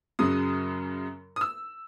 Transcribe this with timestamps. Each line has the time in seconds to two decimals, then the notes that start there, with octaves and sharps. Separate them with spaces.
0.19 F#2 C#3 F#3 D#6
1.36 D#6
1.41 E6